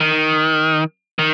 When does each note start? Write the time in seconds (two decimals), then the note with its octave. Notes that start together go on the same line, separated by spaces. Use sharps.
0.01 D#3
1.19 D#3